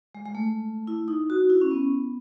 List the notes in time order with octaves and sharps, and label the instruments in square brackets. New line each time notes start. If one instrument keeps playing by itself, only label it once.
[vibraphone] G#3
G#3
A3
E4
D#4
F#4
E4
C#4
B3